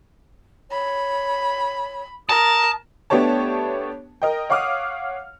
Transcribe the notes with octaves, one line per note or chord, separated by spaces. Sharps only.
C#5 B5
A#4 A5 A#5 D#6
A3 B3 D4 G4 C#5 A5
A#4 D#5 G5
C#5 F5 F#5 D6 D#6 F6